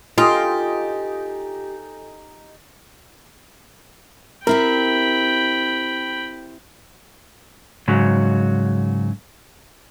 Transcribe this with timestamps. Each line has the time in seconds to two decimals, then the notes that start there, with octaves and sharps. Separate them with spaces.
0.18 D#4 F4 G4 A4 G#5 A6
4.47 C4 E4 G4 A#4 G5 B5
7.88 G#2 C#3 F#3